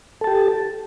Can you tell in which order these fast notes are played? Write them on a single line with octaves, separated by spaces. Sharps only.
A4 A5 G4